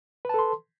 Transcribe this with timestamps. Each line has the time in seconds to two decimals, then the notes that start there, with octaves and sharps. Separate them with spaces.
0.25 B4
0.29 A5
0.34 A4
0.39 C6